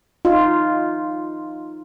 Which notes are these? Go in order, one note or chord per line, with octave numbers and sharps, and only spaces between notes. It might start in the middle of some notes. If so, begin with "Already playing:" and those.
D#4 F4